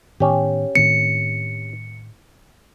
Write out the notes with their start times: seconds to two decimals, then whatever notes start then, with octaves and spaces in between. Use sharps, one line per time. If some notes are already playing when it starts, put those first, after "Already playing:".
0.20 A2 D#3 B3 C#4 G4
0.75 A2 D#3 C4 C#7